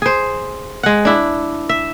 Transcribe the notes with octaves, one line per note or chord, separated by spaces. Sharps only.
G#4 C5
G#3 F#5
D4 E4
E5